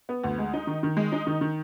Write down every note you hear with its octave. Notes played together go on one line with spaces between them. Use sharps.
B3
D2
G#3
D#4
D#3
D#3
G#3
D#4
D#3
D#3